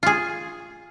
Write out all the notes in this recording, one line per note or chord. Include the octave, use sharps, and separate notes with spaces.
F4 G#4